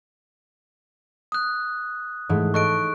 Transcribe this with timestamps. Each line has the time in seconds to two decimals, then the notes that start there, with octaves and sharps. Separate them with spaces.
1.32 D#6 F#6
2.29 G#2 E3 A3
2.54 A4 D#5 C#6 F#6 D7